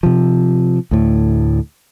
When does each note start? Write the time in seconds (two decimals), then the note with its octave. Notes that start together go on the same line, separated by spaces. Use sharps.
0.03 C3 F3
0.91 D2 A2